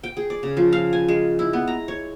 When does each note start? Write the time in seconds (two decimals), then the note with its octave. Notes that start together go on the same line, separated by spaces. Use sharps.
0.04 G5
0.17 G#4
0.30 D5
0.43 C#3
0.57 F3
0.73 F5
0.93 G#5
1.08 G#3
1.39 E4
1.53 B3
1.68 A#5
1.88 C#5